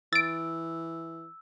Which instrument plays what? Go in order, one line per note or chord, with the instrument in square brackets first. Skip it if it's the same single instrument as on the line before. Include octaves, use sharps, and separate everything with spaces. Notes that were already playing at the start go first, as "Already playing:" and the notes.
[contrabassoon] E3 [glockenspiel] E6 [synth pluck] A6 D7